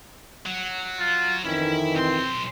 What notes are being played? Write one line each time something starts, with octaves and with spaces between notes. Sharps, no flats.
F#3
F4
F2 D#3 E3 C#4 E4
B1 C4 C6